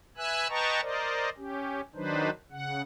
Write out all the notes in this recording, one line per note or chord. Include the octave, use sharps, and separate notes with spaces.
B4 E5 G#5 E6 F#6
B4 D#5 G5 A5 A#5 C#6
A#4 C5 D5 D#5
C#4 G4
D#3 F#3 D4 D#4 B4 C5
C#3 F#5